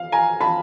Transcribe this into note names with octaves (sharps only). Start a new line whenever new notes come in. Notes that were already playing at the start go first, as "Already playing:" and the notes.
Already playing: F5
G#5 A#5
A5 B5